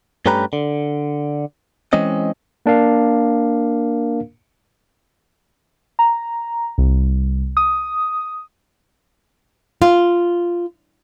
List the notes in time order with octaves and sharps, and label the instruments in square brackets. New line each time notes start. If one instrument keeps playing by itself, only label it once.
[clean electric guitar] G2 A3 C#4 G4 B4 A#5
D3
E3 G#3 C4 C#4 D#5
[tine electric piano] A#3 D4 A#4 F5
[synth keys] A#5
C2
D#6
[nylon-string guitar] F4